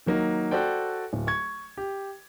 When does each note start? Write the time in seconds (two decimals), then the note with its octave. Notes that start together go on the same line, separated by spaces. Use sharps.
0.06 D#3 F#3 A#3 D#4
0.51 F#4 A4 C5 D5 G5
1.13 D1
1.27 C#6 G#6
1.77 G4